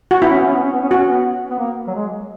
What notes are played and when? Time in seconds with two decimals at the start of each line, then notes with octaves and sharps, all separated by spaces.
0.11 F#4
0.21 B3 E4
0.29 C#4
0.39 B3
0.46 C#4
0.55 B3
0.63 C#4
0.72 B3
0.81 C#4
0.89 B3 F#4
0.98 C#4
1.06 B3
1.50 B3
1.59 A#3
1.87 F#3
1.95 G#3